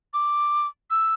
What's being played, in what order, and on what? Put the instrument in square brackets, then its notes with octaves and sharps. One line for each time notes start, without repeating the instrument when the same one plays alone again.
[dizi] D6
E6